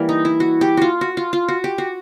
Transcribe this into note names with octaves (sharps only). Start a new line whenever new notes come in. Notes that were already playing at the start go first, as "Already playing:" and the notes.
Already playing: E3 G3 A#3
D#4
E4
F#4
G4
F4 F#4
F#4
F4
F4
F#4
G4
F#4